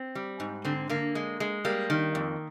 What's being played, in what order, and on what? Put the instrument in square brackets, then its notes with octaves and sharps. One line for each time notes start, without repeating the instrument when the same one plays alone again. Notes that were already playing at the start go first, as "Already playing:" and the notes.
Already playing: [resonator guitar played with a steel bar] C4
G3
G#2
D3 C4
D3 A#3
G#3
G#3
G3 A#3
D#3
F2